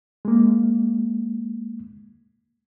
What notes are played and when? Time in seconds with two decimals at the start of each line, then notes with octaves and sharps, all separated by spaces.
0.25 G#3 A#3